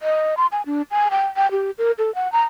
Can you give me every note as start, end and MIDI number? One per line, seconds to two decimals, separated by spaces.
0.01 0.35 75
0.37 0.46 84
0.52 0.62 80
0.66 0.82 62
0.91 1.08 80
1.11 1.26 79
1.37 1.50 79
1.51 1.71 67
1.78 1.92 70
1.98 2.13 69
2.15 2.31 78
2.32 2.44 82